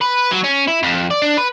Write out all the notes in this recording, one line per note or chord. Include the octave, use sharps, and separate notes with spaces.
B4
F#3
C#4
E4
F2
D5
D4
B4